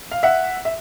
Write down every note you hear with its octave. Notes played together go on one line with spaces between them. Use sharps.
F5
E5 F#5
E5